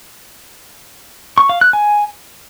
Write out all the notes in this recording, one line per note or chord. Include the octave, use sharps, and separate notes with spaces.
C#6
F5
F#6
G#5